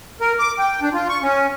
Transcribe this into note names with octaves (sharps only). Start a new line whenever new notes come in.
A#4
D6
G5
D4
F4
C#6
C#4